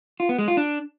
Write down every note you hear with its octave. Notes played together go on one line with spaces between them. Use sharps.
F4
B3
G#3
F4
D4